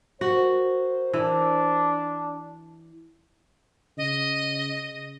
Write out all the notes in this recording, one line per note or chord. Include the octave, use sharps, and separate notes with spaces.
F#4 A#4 C5
E3 D4
C#3 D#5